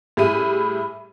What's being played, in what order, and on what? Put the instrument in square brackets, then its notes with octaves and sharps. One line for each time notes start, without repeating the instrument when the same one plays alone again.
[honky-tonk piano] A2 G3 E4 G#4 B5 D#7